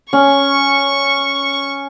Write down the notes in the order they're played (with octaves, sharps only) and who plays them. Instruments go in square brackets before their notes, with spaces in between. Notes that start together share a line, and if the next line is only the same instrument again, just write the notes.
[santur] C#4 [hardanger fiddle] C#6